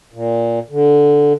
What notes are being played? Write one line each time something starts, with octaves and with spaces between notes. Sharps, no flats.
A#2
D3